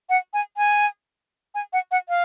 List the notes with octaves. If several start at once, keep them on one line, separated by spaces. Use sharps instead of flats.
F#5
G#5
G#5
G#5
F#5
F#5
F5